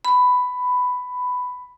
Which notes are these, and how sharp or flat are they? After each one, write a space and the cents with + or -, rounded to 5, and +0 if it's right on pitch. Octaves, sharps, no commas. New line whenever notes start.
B5 +10